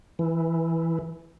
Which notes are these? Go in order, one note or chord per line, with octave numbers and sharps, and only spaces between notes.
E3